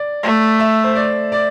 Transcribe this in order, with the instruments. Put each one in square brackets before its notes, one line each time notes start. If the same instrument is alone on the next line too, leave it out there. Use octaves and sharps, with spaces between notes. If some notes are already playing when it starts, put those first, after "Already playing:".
Already playing: [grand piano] D5
[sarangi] A3
[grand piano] E5
C5
D5
D5